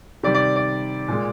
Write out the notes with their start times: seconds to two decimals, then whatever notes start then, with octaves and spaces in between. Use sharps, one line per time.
0.23 C3 D#3 G3 D5
0.35 D5
0.56 D5
1.08 A#2 G#3